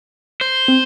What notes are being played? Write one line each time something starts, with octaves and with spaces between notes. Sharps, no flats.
C5
C4